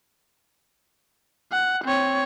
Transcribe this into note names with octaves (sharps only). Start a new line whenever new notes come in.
F#5
C4 C#5